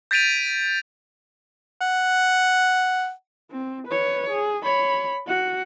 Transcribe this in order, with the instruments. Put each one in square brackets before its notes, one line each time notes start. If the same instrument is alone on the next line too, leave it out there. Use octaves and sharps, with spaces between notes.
[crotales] G6 A6 B6 D7 D#7 F7
[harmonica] F#5
[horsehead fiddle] C4
B4 C#5
G#4
C#5 B5
F#4 F#5